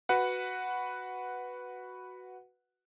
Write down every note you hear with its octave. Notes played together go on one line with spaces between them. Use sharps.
F#4 B4 F#5